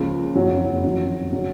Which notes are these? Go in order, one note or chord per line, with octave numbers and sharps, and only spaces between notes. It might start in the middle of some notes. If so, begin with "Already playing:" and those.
Already playing: C#2 C#3 F3 A#3
F#1 F2 C#3 F#3
F2 D#3 F#3
C#3 F#3